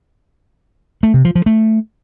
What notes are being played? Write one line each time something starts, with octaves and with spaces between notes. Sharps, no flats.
A3
C3
F3
F3
A3